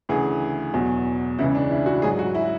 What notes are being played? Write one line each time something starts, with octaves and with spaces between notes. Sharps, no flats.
D2 C#3 E3 G#4
E2 B2 F#3
C#2 C#3 E3 E4
D4
E4
F#4
G#2 F#3 G#4
F#4
E4